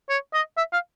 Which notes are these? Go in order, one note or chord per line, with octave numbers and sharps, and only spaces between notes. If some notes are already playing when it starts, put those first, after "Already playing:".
C#5
D#5
E5
F5